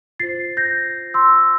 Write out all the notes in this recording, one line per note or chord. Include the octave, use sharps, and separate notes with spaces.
F4 C5 A6 C7
G6 A#6
C6 E6